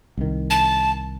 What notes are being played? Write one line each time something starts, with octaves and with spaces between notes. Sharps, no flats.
C2 D#3
A5